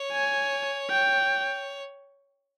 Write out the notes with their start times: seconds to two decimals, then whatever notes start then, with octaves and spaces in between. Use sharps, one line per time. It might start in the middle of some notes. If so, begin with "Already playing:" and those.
Already playing: C#5
0.12 G#5
0.90 G5